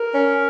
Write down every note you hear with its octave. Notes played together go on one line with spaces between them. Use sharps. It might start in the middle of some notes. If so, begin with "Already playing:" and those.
Already playing: A#4
C#4